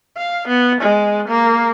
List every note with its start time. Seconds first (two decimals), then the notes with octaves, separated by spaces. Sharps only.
0.18 F5
0.48 B3
0.81 G#3
1.29 A#3